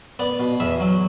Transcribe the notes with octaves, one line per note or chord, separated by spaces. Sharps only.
B3 D5
B2
E2 E5
F#3